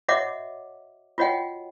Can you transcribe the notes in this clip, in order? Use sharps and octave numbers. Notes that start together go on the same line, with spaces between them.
F#4 C#5 D#5 E5 F#5 D6
F4 F#4 C#5 D#5 F#5 G5